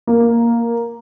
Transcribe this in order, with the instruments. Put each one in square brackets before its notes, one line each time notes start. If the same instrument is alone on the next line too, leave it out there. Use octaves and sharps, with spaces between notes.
[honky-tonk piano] A#3